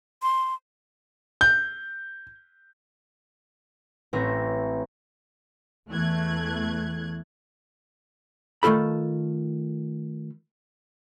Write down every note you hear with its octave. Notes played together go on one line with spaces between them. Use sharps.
C6
G6
A1 C4 C#4 E5 A#6
E2 E3 A3 F#6 G#6
D#3 A3 F4 A4 B5